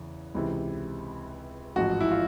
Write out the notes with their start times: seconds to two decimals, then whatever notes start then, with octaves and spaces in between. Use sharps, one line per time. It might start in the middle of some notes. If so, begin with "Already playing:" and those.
Already playing: E2 C#3
0.35 C#2 C3 E3
1.76 A1 G#2 F3 F#4
2.01 E4
2.12 F4